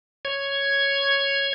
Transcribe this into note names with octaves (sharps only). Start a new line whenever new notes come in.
C#5 G#6